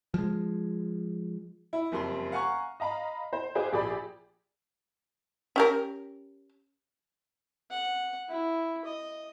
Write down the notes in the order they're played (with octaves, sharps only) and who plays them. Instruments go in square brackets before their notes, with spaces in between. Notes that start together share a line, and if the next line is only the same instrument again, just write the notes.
[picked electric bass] F3 G#3
[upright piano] E4
F#1 F2 G3 C6
F5 F#5 G#5 A#5 C#6
[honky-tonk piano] D#5 F5 A#5 B5
C5
G4 G#4 B4 C5 F5 G5
A#1 G4 G#4 D5 B5
[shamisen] C#4 G4 A#4
[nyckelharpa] F#5
E4
D#5